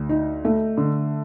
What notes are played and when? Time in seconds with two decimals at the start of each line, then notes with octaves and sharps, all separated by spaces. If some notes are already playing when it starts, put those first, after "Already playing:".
Already playing: D2
0.09 D#4
0.45 A3
0.78 D3